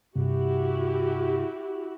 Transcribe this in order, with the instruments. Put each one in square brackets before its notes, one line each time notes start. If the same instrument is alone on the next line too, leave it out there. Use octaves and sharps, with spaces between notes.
[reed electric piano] G2 C3 [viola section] E4 F#4 G4